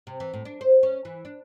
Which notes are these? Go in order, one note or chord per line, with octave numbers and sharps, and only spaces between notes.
C3
E3
A2
D4
C5
C#4
E3
D4